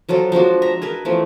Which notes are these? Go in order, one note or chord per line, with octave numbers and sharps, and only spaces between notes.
F3 F#3 F4 A4
F3 G#3 D4 F#4
E5 A#5
G#4 A#4 B4
E3 F3 A3